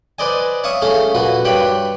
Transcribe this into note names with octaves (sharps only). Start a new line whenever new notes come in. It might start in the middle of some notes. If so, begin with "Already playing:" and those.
B4 C5 D5 D#5 G#5
C#5 E5 F5 C#6 D#6
A3 C#4 G#4 F5
A#2 F#4 B4
G2 G4 B4 C#5 G5 B5